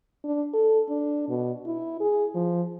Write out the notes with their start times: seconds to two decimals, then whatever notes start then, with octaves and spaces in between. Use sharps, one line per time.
0.24 D4
0.54 A4
0.89 D4
1.29 B2
1.66 E4
2.00 G#4
2.35 F3